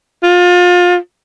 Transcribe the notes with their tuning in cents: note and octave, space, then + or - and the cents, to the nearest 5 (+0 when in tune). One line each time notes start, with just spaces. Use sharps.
F4 +30